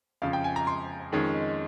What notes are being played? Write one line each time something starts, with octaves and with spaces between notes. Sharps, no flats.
F2 C#3 F3 F5
G5
G#5
A#5
C6
F2 D#3 G#3 C#4